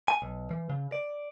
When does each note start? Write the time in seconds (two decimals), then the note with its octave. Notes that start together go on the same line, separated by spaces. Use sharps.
0.08 G#5
0.22 B1
0.51 E3
0.70 C#3
0.92 D5